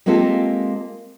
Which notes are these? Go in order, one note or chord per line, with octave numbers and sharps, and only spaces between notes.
G#3 A#3 C4 F4 G4 A4